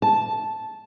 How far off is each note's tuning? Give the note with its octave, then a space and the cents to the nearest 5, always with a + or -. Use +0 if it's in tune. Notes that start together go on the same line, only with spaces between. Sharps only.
A5 -10